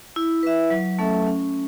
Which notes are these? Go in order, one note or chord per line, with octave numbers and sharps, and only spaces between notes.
E4
B4 E5
F#3
A3 C#4 A4 E5
C#4